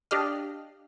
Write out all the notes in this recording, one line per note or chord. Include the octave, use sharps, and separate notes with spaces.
D4 G4 D#5 F5